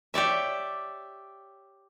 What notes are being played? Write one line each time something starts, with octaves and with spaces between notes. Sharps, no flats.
G4 C#5 D5 E5